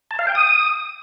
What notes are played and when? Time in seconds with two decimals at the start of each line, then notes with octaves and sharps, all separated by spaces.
0.11 A5
0.19 F5
0.27 G5
0.35 D#6